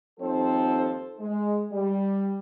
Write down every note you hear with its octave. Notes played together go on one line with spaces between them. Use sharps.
D#2 F3 C4 D#4 A4 C5
G#3
G3